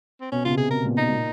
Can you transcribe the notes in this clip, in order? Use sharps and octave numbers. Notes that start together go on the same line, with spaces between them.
C4
B2 C#4
C#3 F4
C3
G#4
B2 A#4
A#2
B2
D#4
B2
A#2